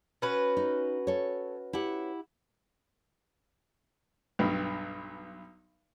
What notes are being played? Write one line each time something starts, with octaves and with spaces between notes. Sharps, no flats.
C#4 F#4 B4
D#4
A4 C#5
E4 G4 F#5
B1 G2